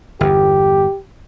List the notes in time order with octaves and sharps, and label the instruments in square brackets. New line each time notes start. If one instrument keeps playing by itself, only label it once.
[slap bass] G1 E2 [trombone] G4